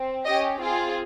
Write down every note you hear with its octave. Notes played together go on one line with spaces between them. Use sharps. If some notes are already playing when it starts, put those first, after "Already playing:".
Already playing: C4
C#4 G4 D#5
C4 F4 G#4